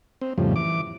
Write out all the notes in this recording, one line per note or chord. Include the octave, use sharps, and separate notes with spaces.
C4
F2 A2 C#3 F3 G3
E3 D6